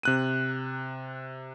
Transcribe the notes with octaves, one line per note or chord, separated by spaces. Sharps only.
C3 F#6 D#7